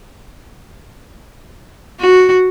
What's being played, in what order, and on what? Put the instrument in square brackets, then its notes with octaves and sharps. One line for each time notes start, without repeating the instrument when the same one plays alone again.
[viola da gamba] F#4